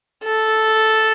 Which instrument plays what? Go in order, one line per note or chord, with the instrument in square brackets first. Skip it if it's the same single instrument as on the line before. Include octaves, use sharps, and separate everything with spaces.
[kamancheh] A4